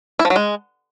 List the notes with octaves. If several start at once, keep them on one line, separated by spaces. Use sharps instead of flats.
E4
F3
F#3
G#3